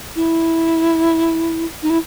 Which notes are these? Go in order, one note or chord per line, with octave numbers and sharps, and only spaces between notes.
E4
D#4
E4